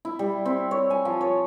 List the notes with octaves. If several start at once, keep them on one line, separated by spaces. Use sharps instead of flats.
E4
G3
C4
C#5
G#5
F3
C#5